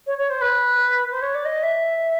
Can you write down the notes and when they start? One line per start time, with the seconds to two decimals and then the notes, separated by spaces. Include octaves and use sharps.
0.07 C#5
0.18 C#5
0.30 C5
0.41 B4
1.11 C5
1.22 C#5
1.35 D5
1.45 D#5
1.63 E5